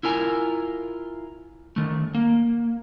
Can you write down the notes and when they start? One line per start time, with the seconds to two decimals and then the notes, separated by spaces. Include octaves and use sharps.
0.03 E4 F4 A#4 G#5
1.76 D#3 A3
2.14 A#3